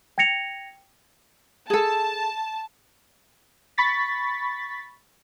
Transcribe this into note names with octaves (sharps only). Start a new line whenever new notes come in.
G5 G#6 A#6 C#7 F7
G#4 A4 A5
B5 C#6 A6 B6